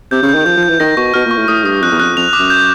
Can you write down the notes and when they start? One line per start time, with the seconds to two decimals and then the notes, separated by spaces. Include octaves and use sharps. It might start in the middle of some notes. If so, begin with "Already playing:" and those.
0.11 C3 G6
0.23 C#3
0.29 G6
0.35 D#3
0.45 F3 G6
0.57 F3
0.63 G6
0.69 E3
0.80 D#3 A#6
0.97 B2 C#6
1.14 B2 F6
1.26 A#2
1.31 C#6
1.37 A2
1.48 A2 D#6
1.65 G2 D#6
1.83 F2 F#6
1.92 E2
2.00 F2 F#6
2.17 F2 F7
2.33 D6
2.39 F#2
2.50 G6